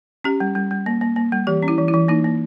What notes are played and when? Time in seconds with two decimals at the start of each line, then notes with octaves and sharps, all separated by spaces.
0.24 C#4 G4
0.40 G3
0.55 G3
0.71 G3
0.86 A#3
1.01 A#3
1.16 A#3
1.32 G3
1.47 E3 G4
1.63 C#4
1.68 E4
1.78 E3
1.88 E4
1.94 E3
2.08 A#3 D#4
2.24 A#3